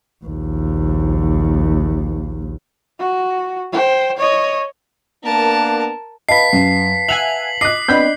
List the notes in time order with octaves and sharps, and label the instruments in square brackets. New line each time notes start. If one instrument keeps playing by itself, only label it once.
[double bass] A#1 D#2
[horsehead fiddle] F#4
C5 G5
C#5 D#5
[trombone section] A#3 B3 D4 [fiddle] A#4 A5
[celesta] B4 F5 A5 [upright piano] D#5 B5 [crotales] B6 C7
[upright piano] F#2
[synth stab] E5 F#5 G#5 [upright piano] F7 [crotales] F#7
[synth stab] D#5 [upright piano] D6 F#6 [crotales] C7
[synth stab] B3 C4 B5 [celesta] D4 D5 D#5 [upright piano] G6